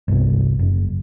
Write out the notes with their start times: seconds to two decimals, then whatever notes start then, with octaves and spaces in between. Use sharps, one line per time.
0.08 G1 C2
0.59 F#1